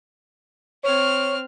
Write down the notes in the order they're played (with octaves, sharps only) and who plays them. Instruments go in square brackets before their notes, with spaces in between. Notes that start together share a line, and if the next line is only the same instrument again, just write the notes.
[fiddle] C4 F6 [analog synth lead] C#5